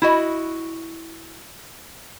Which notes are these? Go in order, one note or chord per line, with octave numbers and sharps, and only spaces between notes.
E4 F#4 D#5